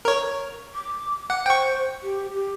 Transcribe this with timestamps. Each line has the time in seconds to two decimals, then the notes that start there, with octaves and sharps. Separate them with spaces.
0.05 A#4 C#5
0.75 D6
1.30 F#5
1.46 C5 G5 C#6
2.03 G4
2.34 G4